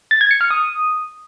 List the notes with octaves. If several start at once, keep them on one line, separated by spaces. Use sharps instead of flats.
A6
G#6
C#7
F6
D#6